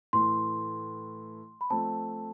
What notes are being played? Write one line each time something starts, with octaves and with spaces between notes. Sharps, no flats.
A2 E3 A3 C6
B5
F3 A3 C4 A5